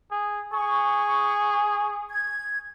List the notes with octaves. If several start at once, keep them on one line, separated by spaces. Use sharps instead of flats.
G#4
G#4 C#6
G#6